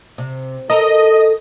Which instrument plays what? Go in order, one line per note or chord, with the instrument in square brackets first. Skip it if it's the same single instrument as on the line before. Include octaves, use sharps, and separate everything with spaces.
[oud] C3
[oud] A4 A#4 [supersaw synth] D#5